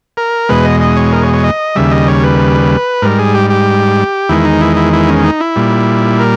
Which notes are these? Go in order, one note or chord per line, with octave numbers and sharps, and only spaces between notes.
A#4
E2 B2 G#3 B4
D#5
D#5
C#5
A#4
C#5
C#5
D#5
D#2 C#3 G3 E5
D#5
C#5
B4
G#2 G3 A#4
G#4
G4
G4
E2 D#3 G#3 E4
D#4
E4
E4
E4
C#4
D#4
E4
A#2 G3
A#4